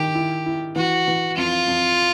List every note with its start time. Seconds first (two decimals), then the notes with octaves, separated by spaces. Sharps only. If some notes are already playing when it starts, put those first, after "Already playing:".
Already playing: D#3 G4
0.15 E4
0.46 E4
0.76 E3 F#4
1.07 E3
1.37 F2 F4
1.68 F2